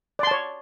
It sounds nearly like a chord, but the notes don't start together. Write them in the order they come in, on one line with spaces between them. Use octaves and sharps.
D5 C6 A5 C#5